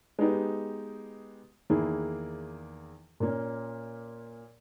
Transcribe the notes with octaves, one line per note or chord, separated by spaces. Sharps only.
G#3 B3 D#4 G4
E2 D#3 A#3 E4 G#4
A#2 A#3 C#4